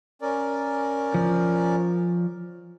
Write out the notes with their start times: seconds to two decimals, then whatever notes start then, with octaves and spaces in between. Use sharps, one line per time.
0.22 C#4 A#4 D5
1.14 F3